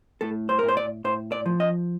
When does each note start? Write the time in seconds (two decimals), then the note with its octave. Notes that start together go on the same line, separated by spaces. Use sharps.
0.21 A2 A4
0.49 C5
0.59 A#4
0.63 A2
0.68 C5
0.77 D5
1.04 A2 C5
1.32 D5
1.46 F3
1.60 D#5